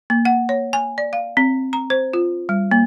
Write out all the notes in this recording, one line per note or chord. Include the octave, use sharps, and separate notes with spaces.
A#3
F#5
C#5
G#5
D5
F5
C4
A#5
C5
F4
G3
A#3